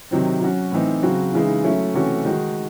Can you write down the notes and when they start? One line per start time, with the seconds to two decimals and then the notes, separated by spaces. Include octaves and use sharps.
0.11 C3 D#3 F#3 C4
0.41 F#3 C#4 F#4
0.72 A2 E3 C4 D#4
1.03 C#3 F#3 C4 F#4
1.33 C#3 E3 G#3 D#4
1.64 F#3 A3 C#4 E4
1.94 C3 E3 A3 C#4 F#4
2.25 D#3 G#3 D#4 F#4